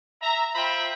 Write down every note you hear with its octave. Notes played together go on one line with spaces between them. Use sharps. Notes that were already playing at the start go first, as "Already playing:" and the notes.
E5 A#5
F4 C5 E5 G5 B5